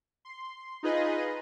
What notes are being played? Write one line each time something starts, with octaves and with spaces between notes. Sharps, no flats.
C6
D#4 F4 G#4 B4 D#5